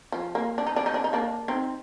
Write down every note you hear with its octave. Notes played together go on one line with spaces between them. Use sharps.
F3
A#3
D4
D#4
D4
D#4
D4
D#4
A#3 D4
C4 D#4